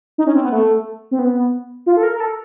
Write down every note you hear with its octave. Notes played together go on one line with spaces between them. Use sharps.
D#4
C#4
C4
B3
A3
C4
B3
F4
A4
A#4
A#4
A4